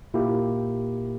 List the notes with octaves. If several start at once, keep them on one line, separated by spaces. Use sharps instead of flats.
A#2 A#3 E4 G4